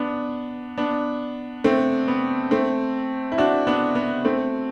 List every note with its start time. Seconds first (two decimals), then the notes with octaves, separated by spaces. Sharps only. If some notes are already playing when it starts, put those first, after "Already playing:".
Already playing: B3 D4
0.78 B3 D4
1.64 A3 C4
2.08 B3
2.51 A3 C4
3.32 E4
3.38 D4 F#4
3.67 B3 D4
3.95 B3
4.25 A3 C4